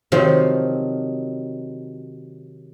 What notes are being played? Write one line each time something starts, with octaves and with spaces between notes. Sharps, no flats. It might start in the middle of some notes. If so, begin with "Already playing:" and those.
C3 D#3 F3 F#3